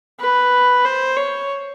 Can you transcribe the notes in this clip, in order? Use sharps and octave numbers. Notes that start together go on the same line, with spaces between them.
B4
C5
C#5